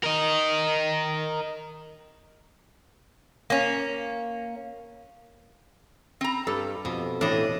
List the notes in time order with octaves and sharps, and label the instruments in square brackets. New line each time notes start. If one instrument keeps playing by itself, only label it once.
[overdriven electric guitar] A#4 D#5
[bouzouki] A#3 C#4
[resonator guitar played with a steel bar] C4 A#5
[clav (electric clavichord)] G2 G3 [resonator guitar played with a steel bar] A4
[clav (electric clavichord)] F2 [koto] B2
[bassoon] A2 [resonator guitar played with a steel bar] E3 [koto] D4 D#5